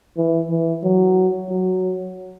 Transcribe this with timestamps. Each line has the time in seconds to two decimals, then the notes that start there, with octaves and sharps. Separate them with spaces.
0.17 E3
0.50 E3
0.83 F#3
1.49 F#3